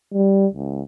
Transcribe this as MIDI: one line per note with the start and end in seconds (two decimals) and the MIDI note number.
0.14 0.47 55
0.54 0.82 37